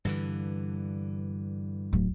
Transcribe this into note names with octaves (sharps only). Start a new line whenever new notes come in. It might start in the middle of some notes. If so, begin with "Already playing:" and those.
G2 D3 E3
D1